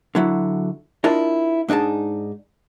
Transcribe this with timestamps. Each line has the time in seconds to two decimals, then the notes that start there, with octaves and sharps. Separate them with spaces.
0.15 D3 F#3 E4
1.04 D4 E4 F4 A#4 D5 D#5
1.68 G#2 D4 D#4 G#4 A5